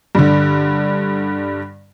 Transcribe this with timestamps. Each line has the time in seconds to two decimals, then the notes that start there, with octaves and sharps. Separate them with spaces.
0.15 G2 D3